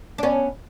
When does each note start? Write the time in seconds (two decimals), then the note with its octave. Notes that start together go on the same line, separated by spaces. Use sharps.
0.18 D4
0.23 B3 C#4